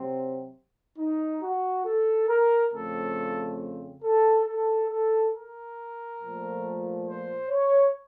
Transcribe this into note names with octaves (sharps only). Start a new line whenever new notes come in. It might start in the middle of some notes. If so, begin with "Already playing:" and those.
Already playing: C3 F#3 C4
D#4
F#4
A4
A#4
F2 C#3 A3 C4 A4
A4
A4
A4
A#4
A#2 F3 A3
C5
C#5